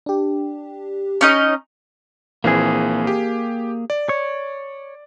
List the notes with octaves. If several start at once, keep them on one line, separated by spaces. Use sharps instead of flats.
D4 G4
C#4 D#4 D#5
A#1 E3 A#3 C4 G#4
G4
D5
C#5